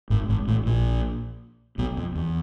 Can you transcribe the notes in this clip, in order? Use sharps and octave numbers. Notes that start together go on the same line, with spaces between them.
G#1 G#2
G#1 G#2
A1 A2
A#1 A#2
B1 B2
F2
E2